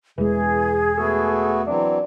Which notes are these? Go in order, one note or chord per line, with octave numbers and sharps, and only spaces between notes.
E1 E3 G#3 G#4
A3 B3 F#4 A4
E3 F#3 C4 D4